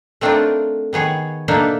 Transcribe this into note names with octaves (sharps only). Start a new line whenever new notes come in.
A3 C4 D4 D#4 F4 A#4
D#3 B3 G#4 C#5
B2 A#3 D4 D#4 A4 E5